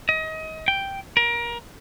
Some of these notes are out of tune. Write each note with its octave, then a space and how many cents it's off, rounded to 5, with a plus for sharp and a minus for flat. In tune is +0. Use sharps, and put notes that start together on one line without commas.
D#5 +30
G5 +0
A#4 +25